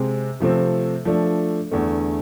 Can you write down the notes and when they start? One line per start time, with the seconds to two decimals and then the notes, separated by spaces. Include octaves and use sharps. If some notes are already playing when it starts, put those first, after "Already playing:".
Already playing: C3 G#3 C4
0.40 C3 F3 A3 C4
1.05 F3 A3 D4
1.71 E2 D3 A3